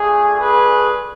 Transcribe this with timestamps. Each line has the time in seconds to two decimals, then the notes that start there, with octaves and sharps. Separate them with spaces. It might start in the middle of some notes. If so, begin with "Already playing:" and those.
Already playing: A3 D4 F4 G#4
0.39 G#4 B4